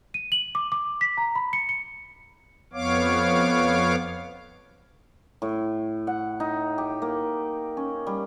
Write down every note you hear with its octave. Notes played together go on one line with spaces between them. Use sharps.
D#7
F#7
D6
D6
B6
A#5
B5
C#7
C#7
F2 B3 C#5 F5 D6
A2
F#5
D#4
G4
A#3
C#4
G3